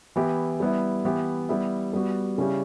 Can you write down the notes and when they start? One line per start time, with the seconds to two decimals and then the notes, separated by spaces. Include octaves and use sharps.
0.16 E3 B3 E4 G4
0.60 G3 B3 E4
1.05 E3 B3 E4 G4
1.49 G3 B3 E4
1.93 G3 B3 F#4
2.38 C#3 G3 C#4 E4 G4